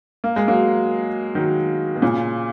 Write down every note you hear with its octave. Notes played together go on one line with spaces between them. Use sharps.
A#3
G#3
F#3 A#3
D#3 F#3
B2
A#2 C#3